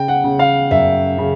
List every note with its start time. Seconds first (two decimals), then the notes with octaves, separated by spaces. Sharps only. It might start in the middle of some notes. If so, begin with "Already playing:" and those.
Already playing: C#3 G5
0.08 F#5
0.24 C#3
0.39 F5
0.71 F#2 E5
1.18 C#3